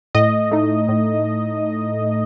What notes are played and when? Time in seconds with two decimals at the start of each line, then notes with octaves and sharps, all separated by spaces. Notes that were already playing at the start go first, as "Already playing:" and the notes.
0.15 A2 D#5
0.51 A3 D#4
0.88 A2